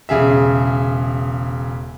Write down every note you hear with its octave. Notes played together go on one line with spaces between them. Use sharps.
E1 C#3 G#4 E5